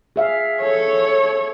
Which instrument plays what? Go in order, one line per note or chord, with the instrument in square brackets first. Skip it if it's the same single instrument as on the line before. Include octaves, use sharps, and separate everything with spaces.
[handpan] G#4 E5 F5
[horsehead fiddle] A4 C#5